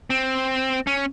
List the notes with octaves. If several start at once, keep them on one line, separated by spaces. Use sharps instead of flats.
C4
C#4